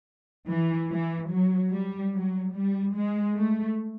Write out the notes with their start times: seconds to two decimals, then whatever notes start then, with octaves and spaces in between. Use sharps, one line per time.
0.48 E3
0.90 E3
1.30 F#3
1.71 G3
2.13 F#3
2.54 G3
2.95 G#3
3.36 A3